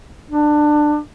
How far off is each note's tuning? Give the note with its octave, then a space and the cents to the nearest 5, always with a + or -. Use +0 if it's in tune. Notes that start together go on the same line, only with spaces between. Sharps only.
D4 +20